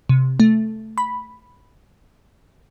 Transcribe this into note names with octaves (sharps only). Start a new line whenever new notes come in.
C3
A3
B5